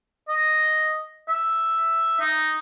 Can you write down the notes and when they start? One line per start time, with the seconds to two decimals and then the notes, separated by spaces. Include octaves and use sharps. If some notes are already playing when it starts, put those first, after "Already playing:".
0.29 D#5
1.28 E5
2.20 D#4